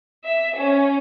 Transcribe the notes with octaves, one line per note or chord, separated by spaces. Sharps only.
E5
C#4